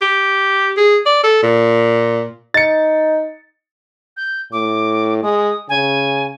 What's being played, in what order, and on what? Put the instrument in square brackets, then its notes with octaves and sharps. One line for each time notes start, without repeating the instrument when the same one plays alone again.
[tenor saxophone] G4
G#4
D5
A4
A#2
[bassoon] D#4 [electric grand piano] A6 C#7
[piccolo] G6
[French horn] A2 [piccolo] D6
[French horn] G#3 [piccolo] D#6
[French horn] C#3 [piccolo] G#5